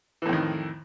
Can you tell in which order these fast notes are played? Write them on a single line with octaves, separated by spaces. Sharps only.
E3 A2 F2 D#3